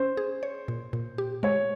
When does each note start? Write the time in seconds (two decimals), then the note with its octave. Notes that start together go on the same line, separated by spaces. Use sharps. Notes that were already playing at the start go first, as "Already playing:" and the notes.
Already playing: C#4 C5
0.17 G#4
0.43 C#5
0.68 A#2
0.93 A#2
1.18 G4
1.43 G#3 C#5